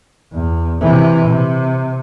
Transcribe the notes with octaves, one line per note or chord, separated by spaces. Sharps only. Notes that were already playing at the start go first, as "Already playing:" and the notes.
E2
C3 E3
C3